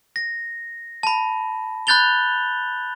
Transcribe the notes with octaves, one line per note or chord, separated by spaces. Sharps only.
A#6
A5 B5
B5 F#6 G6 A6 F7 G7